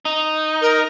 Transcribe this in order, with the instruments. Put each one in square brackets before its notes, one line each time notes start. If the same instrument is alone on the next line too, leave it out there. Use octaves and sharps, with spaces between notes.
[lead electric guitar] D#4
[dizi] A#4